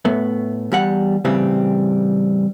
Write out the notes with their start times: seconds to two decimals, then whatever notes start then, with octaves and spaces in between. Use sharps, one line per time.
0.05 A2 A3 B3
0.72 E2 G3 F#5
1.25 A2 C#3 E3 G3 C4